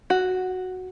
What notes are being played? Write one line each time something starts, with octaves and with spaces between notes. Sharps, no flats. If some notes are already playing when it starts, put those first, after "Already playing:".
F#4